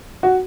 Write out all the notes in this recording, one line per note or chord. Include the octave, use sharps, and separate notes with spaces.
F#4